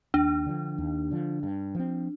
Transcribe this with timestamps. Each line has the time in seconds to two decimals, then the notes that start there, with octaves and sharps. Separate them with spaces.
0.14 D#2 D4
0.46 D3 F3
0.78 D#2
1.11 D3 F3
1.43 G2
1.75 F3 C4